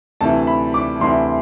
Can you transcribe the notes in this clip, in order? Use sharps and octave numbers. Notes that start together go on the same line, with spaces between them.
D2 C3 E3 A5
B5
D6
D2 C3 E3 C6